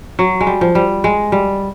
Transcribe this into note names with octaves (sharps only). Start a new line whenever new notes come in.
F#3
G#3
G3
F3
G3
G#3
G3